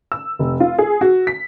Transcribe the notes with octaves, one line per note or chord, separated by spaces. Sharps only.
E6
F1
F4
G#4
F#4
B6